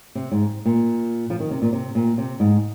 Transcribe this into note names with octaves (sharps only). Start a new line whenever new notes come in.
C3
G#2
A#2
F3
D#3
C3
A#2
C3
A#2
C3
G#2